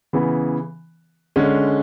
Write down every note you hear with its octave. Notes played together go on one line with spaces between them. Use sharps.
C#3 E3 B3
D3 G#3 C#4